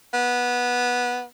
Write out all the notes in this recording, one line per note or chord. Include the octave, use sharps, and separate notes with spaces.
B3